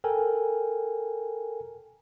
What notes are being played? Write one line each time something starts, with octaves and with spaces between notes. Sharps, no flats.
A4 A#4 G5 G#5